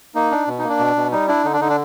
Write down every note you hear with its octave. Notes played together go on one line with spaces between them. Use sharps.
A#3 D#4
D4
B2
D#4
A#3
D4
B2
B2
G3 D#4
D4 E4
D3 D#4
D4
D3 D#4
D4